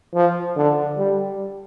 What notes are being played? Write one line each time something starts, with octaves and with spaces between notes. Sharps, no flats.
F3
D3
G3